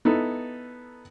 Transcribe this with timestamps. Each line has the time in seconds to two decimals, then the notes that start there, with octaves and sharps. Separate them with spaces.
0.05 B3 D#4 E4 A4